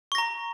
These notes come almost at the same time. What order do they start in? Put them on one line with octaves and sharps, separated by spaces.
C#6 A#6 A#5